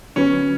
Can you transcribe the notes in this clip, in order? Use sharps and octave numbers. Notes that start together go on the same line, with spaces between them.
D3 F#3 B3 C#4 F#4 B4